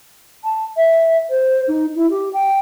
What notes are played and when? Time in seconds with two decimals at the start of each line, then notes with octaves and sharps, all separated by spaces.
0.44 A5
0.77 E5
1.30 C5
1.68 D#4
1.96 E4
2.10 G4
2.33 G5